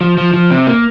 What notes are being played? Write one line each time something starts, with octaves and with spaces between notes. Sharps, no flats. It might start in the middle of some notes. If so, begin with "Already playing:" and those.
F3
F3
F3
C3
A#3